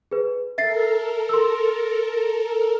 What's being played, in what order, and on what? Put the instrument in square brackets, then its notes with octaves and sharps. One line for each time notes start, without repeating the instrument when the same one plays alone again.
[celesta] G#4 B4
[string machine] A4 A#4 [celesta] E5 A6 C7
[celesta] C6 E6